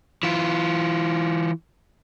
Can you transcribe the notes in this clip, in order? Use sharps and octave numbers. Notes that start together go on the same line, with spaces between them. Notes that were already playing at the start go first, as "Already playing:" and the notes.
E3 F4